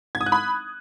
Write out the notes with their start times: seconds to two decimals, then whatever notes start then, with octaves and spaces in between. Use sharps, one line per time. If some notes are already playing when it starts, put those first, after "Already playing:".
0.15 G#6
0.21 D#6
0.26 F#6
0.32 B5